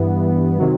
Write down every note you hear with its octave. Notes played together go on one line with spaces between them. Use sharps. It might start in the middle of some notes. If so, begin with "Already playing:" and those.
Already playing: G2 E3 B3
C3 D#3 F#3